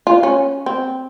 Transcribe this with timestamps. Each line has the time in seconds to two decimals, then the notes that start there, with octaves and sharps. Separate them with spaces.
0.07 F4
0.23 C#4
0.66 C4